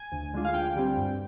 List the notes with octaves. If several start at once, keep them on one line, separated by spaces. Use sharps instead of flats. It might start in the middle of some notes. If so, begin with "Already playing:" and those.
Already playing: G#5
D2
D3 G#3 D4 F4
F5
D2 G5
D3 G3 C4
G2